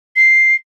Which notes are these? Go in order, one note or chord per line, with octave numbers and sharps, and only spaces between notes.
C7